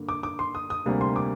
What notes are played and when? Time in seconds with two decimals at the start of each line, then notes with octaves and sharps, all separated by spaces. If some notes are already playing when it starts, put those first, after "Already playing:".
Already playing: G2 D3 A#3
0.09 D6
0.23 D6
0.39 C6
0.55 D#6
0.70 D#6
0.86 D2 C3 G3 A#3
1.01 C6
1.16 D6